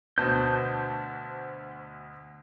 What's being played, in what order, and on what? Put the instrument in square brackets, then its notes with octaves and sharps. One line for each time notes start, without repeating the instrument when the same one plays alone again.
[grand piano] D2 B2 [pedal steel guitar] C5 A5 G6